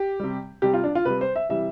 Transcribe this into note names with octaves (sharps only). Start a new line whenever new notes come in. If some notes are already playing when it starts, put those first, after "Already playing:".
Already playing: G4
C3 G3
C3 G3 G4
F4
D4
F4
C3 G3 B4
C5
E5
C3 E3 G3 E5